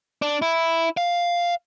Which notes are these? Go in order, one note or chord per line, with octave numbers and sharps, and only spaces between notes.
D4
E4
F5